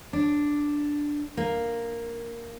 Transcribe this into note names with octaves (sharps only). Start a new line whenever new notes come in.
D4
A#3